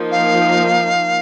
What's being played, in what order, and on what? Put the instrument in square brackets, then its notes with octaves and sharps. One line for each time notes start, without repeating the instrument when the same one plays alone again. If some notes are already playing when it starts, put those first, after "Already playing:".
Already playing: [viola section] F3 A#3 D#4
[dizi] F5